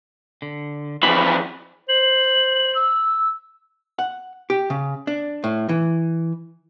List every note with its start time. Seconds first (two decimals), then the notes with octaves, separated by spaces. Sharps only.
0.42 D3
1.03 F2 E3 B5
1.89 C5 F#7
2.75 E6
3.99 F#5
4.50 G4
4.70 C#3
5.07 D4
5.44 A2
5.69 E3